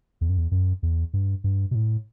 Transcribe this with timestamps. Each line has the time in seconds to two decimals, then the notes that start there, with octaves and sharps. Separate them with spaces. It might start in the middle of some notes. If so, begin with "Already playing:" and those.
0.21 E2
0.29 F#2
0.38 E2
0.51 F#2
0.83 E2
1.13 G2
1.44 G2
1.71 B2
1.75 A2